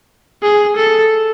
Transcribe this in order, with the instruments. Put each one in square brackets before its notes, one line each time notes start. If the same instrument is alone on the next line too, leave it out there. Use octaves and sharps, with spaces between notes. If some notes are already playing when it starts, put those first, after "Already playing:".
[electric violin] G#4
A4